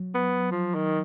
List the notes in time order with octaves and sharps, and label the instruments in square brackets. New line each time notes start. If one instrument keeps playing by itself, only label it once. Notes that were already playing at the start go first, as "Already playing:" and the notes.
Already playing: [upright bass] F#3
[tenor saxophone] B3
F3
D#3